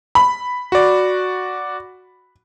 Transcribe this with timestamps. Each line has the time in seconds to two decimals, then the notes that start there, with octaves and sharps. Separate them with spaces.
0.15 B5
0.72 F#4 D5